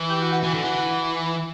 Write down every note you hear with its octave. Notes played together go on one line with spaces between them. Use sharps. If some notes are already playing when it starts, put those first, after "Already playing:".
Already playing: E3
G4 G5
F#4 F#5
F#4 F#5
E3
D3
E3